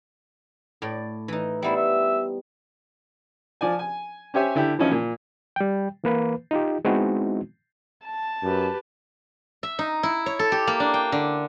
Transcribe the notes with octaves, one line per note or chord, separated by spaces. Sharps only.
A2 D5
E3 D#4
G3 B3 E4 C5
E5
F3 D5 G#5
G#5
C#4 G4 C5 C#5 E5 G#5
D3 E4 G4
E3 F3 C#4 D#4 E4
A#2
G3 G5
E3 A#3 B4
D#4 F4 G4
G#3 B3 C4 D#4 E4 F#4
A5
F#2 G4 B4
E5
D#4
E4
C#5
A4
G4
A#3
D4
G5
D3